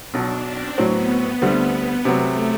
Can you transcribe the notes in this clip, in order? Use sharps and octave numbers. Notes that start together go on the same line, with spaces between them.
B1 B2 F#3 D4
C4
A2 F#3 B3 C4
B3
D2 D3 G3 C4
C3 F#3 A3 B3